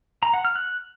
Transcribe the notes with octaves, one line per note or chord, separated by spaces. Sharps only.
A#5
F#5
F6
F#6